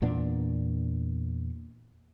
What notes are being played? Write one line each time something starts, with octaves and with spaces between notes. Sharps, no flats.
E2 A#2 B3 D4